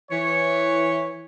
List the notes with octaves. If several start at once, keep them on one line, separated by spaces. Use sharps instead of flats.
E3 C#5